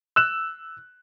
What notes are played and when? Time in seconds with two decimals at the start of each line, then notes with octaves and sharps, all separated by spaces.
0.16 E6 F#6 E7